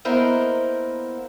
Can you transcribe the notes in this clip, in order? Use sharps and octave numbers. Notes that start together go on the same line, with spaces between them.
A#3 B3 E4 A#4 C5 D#5